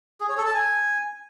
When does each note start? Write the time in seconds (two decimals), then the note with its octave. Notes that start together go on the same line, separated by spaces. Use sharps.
0.21 G#4
0.29 C#5
0.37 A4
0.46 A5
0.54 G#5